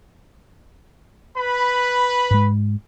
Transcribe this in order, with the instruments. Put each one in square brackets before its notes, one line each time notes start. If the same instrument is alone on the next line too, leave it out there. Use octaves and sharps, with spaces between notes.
[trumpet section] B4 B5
[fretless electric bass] G#2 G#3